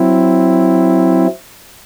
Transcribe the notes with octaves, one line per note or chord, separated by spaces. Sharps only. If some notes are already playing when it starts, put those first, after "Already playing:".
Already playing: F#3 C4 E4